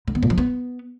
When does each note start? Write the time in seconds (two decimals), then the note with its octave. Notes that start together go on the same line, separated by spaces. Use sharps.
0.08 D3
0.15 B3
0.23 A#2
0.30 F3
0.38 B3